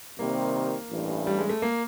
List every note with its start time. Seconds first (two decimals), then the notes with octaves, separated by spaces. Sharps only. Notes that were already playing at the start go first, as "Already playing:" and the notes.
0.19 C3 D#3 G3 A#3 C4
0.90 A1 G2 E3
1.27 G3
1.38 G#3
1.49 A3
1.62 A#3